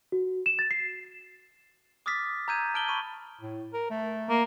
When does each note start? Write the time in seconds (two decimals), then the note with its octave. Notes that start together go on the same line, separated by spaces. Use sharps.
0.12 F#4
0.46 E7
0.59 A6
0.71 C7
2.06 D6 D#6 F6 A6 B6
2.48 A#5 E6 G6 G#6 D#7
2.74 A5 F6 D7 F#7 G7
2.88 B5 C#6 D#7
3.41 A2
3.73 A#4
3.90 A3
4.29 A#3